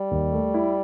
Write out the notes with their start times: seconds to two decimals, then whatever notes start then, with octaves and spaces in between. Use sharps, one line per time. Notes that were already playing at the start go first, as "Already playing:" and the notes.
Already playing: G3
0.11 D#2
0.32 A3
0.54 E4